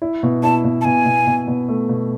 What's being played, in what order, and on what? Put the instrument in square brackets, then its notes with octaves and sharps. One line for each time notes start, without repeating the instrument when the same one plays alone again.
[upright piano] E4
B2
[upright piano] E4 [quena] A5
[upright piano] B2
[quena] A5
[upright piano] B2 [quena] G#5
[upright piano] B2
B2
B2
A3
B2